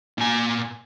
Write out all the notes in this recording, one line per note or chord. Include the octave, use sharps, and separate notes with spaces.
A#2 G#5